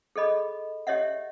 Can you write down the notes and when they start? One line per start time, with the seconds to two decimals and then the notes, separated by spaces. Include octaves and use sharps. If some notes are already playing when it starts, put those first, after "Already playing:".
0.16 G#4 A4 D#5 B5
0.87 G4 C#5 D#5 E5 F#5